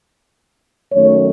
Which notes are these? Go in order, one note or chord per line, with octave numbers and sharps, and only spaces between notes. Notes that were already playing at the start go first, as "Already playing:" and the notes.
F#2 D#3 A3 C#5